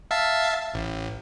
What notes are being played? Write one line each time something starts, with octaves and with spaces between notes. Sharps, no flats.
E5 F5 A5
A1